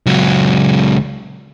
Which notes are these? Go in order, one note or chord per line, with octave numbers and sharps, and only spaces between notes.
C#2 F#3